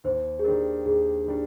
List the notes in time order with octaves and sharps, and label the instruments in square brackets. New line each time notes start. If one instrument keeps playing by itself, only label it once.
[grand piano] D#2 [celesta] C5
[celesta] G#4
[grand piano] D#3 G3 D4 [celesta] A#4
[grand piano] D#2 [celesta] G#4
[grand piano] D#3 G3 D4